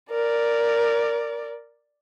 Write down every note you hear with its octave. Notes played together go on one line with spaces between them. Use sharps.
A#4 D5